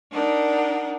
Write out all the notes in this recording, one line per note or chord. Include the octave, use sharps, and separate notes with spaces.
D4 D#4 A#4 F#5